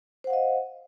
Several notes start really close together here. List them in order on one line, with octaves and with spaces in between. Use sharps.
C5 F#5 F5 D#5